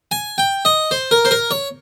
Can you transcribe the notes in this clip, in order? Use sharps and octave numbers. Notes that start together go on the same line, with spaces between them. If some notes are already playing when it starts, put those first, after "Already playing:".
G#5
G5
D#5
C5
A#4
C5
A#4
C#5